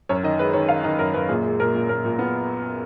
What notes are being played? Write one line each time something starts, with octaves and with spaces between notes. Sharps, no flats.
F#2 C#5
D#3 D#5
G#3 B4
D#3 C#5
D#3 F5
D#3 D#5
F#2 A#4
F#2 B4
A#2 G#4
G#3
A#2 A#4
A#2
A#2 A#4
A#2
B3